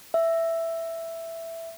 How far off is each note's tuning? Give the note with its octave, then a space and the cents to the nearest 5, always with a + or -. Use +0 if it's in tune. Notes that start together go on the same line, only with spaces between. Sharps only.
E5 +5